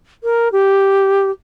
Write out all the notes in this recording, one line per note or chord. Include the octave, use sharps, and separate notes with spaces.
A#4
G4